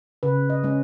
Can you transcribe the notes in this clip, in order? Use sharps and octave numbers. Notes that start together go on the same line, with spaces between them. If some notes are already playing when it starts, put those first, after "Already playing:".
C#3 B4
D#5
G#3 C#4